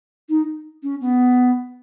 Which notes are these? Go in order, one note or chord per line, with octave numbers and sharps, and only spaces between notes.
D#4
C#4
B3